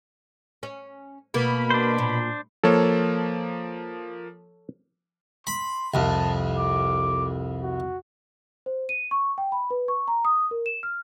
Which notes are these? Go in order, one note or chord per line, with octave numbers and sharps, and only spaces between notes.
C#4
B2 A#3 B3 B5
D4 C5
A#2
F3 A#3 A4 C#5
B5 C6
C2 F2 A5
D6
F#4
C5
D#7
C#6
G5
B5
B4
C#6
A#5
D#6
A#4
E7
F6